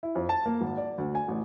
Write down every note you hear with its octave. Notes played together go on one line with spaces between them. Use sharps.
E4
F2
A5
A#3
G#1
D5
D2
G#5
A1